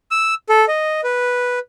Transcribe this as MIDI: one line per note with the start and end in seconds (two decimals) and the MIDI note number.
0.11 0.34 88
0.49 0.65 69
0.68 1.01 75
1.04 1.59 71